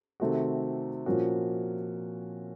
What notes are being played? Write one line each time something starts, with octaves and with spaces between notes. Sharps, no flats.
C3 D#3 A3 C4 F#4
A#2 F3 A#3 C#4 F#4